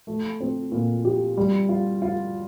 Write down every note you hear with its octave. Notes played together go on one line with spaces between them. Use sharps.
A3
C4
A#2
G4
G3
F4
F4